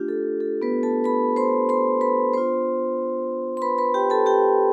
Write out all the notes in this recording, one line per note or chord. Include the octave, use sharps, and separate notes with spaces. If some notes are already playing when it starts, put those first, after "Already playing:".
Already playing: A3 D4 F4 G4
A4
A4
B3 B4
A4 A5
B4 B5
C5 C6
C5 C6
B4 B5
B3 D4 F4 C5 C6
C6
B4 B5
B4 B5
G4 G5
A4 A5
G4 G5